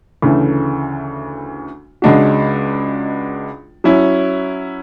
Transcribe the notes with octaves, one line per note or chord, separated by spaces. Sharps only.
D2 C#3 E3 A3
C#2 C#3 G#3 D4 F#4
F#3 C#4 E4